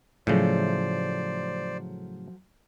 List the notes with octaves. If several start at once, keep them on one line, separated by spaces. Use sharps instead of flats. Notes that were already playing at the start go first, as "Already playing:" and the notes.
A2 C#3 F3 F#3 A3 C5 D5